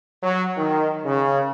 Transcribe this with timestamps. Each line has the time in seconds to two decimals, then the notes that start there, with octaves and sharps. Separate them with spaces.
0.22 F#3
0.57 D#3
1.05 C#3